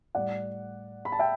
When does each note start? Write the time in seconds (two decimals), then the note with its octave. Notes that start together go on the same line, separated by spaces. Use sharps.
0.15 A2 G3 D5 F#5
1.05 B5
1.12 A5
1.19 E5 G5